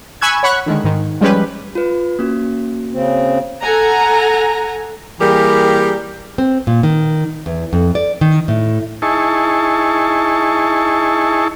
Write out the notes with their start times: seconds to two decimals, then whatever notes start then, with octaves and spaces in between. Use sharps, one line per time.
0.21 G#5 B5 C#6 E6 F#6 G#6
0.43 C#5 F#5 B5 C#6 F#6
0.66 D3 D#3 G#3
0.84 G#2 D#3
1.20 F3 G3 G#3 C#4 G4 B4
1.75 F4 B4
2.19 A#3 C#4 F#4
2.92 C#3 C4
3.62 A4 F#5 G#5 A#5
5.20 E3 G3 A#3 G4 G#4 A#4
6.38 C4
6.67 A#2
6.83 D#3
7.46 E2
7.73 F2
7.95 D5
8.21 D#3
8.48 A2
9.02 D#4 E4 G#4 A5 C#6